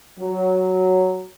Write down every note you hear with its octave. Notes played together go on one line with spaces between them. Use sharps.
F#3